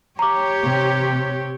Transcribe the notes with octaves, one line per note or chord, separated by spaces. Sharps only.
G4 C#5 A#5 D6
C3